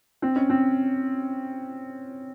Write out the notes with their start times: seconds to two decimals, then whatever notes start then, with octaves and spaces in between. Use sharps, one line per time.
0.22 C4
0.36 C#4
0.50 C4